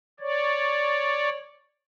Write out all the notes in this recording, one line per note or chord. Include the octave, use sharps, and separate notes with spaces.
C#5 D5